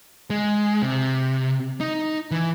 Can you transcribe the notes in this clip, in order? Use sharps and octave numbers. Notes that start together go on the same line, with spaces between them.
G#3
C3
D#4
E3